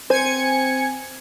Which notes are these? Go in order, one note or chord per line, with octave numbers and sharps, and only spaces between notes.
C4 C5 G#5 G#6 C#7